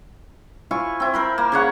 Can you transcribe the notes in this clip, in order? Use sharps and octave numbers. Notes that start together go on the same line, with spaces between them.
E4 F4 G#5 C#6
C4 E4
A#4 C5 B5
A#3
C#3 C#5 F#5